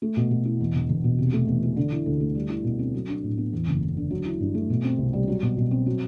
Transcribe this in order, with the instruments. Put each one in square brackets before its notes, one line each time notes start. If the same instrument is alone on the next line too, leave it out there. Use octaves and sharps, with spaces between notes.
[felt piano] A3
B2
B2
E4
E2
E1
E1
B2
C3
A3
E2
E3
D3
E4
D2
A3
G3
E4
B2
C4
F#3
D4
A2
B3
E2
F#1
F#1
D3
F#3
E4
G2
A3
B2
C4
C2
G3
F#3
B2
B2
C4
F#3